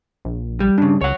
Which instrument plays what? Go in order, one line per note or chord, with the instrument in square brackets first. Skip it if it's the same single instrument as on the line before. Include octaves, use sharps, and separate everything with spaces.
[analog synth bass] A#1
[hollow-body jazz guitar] G3
[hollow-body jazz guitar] G2 C#3 [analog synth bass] D4
[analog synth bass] C#2 [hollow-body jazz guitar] C#5 F#5